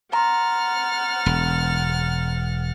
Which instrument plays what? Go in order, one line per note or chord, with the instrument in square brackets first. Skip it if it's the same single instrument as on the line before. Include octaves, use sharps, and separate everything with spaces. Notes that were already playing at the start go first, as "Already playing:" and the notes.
[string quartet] F#5 F6 A6 [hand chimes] A#5 C6
[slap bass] E1